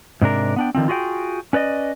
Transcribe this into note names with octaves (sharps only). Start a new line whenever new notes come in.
G#2 C3 D4 A#4
B3 D4 G5
D3 D#3 F3 C4
F4 F#4 G#4 D5 G5
C#4 B4 D5 D#5